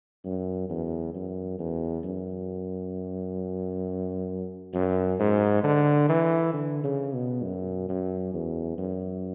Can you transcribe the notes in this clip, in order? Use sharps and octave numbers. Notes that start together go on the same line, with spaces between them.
F#2
E2
F#2
E2
F#2
F#2
G#2
D3
E3
D3
C#3
B2
F#2
F#2
E2
F#2